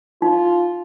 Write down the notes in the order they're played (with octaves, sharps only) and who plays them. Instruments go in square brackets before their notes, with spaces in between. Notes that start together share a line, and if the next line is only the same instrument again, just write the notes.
[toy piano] D#4 [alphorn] F4